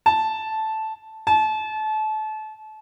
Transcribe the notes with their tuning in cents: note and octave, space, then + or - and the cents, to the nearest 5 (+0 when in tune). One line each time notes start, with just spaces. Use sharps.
A5 -5
A5 -30